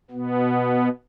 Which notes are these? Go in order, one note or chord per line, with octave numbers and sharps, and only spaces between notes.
B2 B3